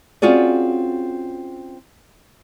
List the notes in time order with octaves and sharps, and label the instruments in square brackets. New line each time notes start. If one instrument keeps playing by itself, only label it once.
[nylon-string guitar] C4 C#4 F4 F#4 G#4 D5